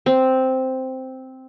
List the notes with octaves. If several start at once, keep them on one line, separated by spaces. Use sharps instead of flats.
C4